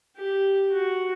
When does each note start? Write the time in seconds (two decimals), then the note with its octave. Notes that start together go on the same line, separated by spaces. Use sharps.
0.16 G4
0.72 F#4